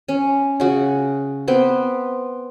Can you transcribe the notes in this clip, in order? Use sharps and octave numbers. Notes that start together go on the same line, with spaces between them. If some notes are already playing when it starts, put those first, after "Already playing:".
C#4
C#3 F#4
B3 C4 B4